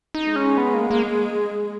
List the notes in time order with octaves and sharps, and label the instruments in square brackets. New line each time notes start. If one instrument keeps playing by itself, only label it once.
[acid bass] D#4
[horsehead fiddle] G#3
[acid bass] C#4
B3
A#3
A#3